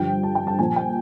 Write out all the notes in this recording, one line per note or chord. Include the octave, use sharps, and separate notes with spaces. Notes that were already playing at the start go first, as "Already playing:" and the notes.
Already playing: G2 D3 F3 G5
A5
G5
A5
A#2 F3 G#5
G5